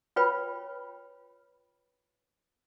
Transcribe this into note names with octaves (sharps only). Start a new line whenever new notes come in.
F4 B4 C#5 G5 B5